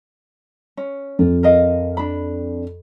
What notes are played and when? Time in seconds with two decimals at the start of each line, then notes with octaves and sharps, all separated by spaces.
0.77 C#4
1.19 F2 F4
1.43 A#4 D#5 F5
1.97 D4 B5